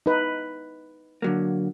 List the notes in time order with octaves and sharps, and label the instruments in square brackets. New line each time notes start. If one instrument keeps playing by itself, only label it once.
[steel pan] D#4 B4
[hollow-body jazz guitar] D3 F#3 A#3